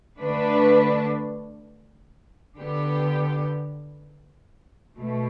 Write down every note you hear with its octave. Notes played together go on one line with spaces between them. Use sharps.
D3 A3 D4 B4
D3 B3 G4
B2 A3